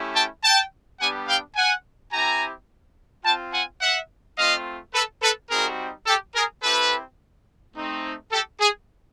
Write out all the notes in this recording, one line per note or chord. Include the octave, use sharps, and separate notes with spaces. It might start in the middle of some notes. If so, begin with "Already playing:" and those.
Already playing: A3 C#4 E4 G4
G5 A5
G5 A5
G3 B3 D4 G4 F#5 G#5
F5 G5
F#5 G#5
C4 E4 G4 G#5 A#5
C4 F4 G5 A5
F#5 G#5
E5 F#5
A3 C4 F4 D#5 F5
A4 B4
A4 B4
G3 C4 D#4 F#4 G#4 A#4
G4 A4
G#4 A#4
C4 E4 G4 A4 B4
A3 C4 D#4
G4 A4
G#4